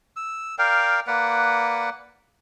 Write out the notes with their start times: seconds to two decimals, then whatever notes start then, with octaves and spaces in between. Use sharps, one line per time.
0.16 E6
0.58 A#4 D5 F5 G5
1.07 A#3 B4 D5 F#5